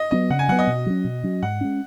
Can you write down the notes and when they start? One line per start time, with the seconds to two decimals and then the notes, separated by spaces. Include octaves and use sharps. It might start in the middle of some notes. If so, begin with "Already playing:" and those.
Already playing: D#5
0.11 F#3 B3 D#5
0.30 C#3 F#5
0.39 G#5
0.48 F#3 B3 F#5
0.59 D#5
0.67 B2
0.86 F#3 C#4
1.04 B2
1.23 F#3 C#4
1.42 G#2 F#5
1.61 G#3 C#4